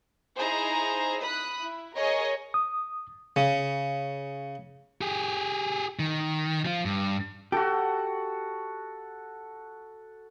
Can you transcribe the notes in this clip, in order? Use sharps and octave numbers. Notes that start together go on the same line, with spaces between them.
D#4 E4 G#4 C5 A#5
B5 D#6 F#6
E4
G#4 A#4 C#5 D#5 G#5
D#6
C#3
G4 G#4
D#3
F3 F4
G2
F#4 G4 A4